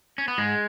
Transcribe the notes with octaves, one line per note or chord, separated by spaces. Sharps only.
C#4
B3
G#2 G#3